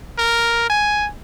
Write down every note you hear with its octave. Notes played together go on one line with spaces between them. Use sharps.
A#4
G#5